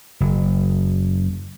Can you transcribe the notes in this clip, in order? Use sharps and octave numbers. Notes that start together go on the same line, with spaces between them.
F#1